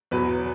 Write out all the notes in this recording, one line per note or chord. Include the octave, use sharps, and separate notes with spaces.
E2 B2 F#3 B4